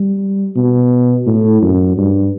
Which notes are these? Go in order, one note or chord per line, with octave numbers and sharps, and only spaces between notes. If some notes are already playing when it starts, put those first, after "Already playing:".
Already playing: G3
B2
A2
F#2
G2